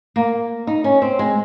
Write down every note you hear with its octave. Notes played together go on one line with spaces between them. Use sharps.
A#3
D#4
C#4
C4
G#3